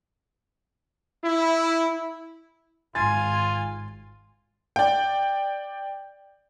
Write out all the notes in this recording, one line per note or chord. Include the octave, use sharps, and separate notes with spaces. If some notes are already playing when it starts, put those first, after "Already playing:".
E4
G#1 G#2 F4 G#5 C6 A6
D5 G5